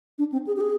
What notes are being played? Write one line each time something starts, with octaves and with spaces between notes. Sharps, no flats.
D4
C4
G#4
G4
G#4